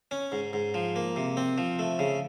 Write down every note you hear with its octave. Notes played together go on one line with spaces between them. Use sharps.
C#4
G#2
G#2
F3
A#3
C3
C4
F3
A3
C#3